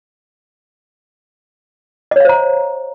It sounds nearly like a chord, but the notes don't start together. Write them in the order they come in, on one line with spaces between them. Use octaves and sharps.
D#5 C#5 F5 C5 A#5